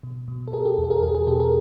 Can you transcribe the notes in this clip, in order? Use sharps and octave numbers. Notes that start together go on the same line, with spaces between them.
B2
B2
A4
B2 G#4 A#4
G4 A4
E2
A4
G#4 A#4
E2 G#4 A#4
G#4
B2 G4 A4
G#4 A#4